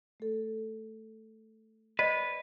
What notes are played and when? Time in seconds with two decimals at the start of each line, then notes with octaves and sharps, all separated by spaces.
0.20 A3 A4
1.99 B4 C5 D5 D#5